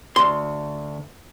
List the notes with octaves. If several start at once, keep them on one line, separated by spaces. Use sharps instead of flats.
D2 C6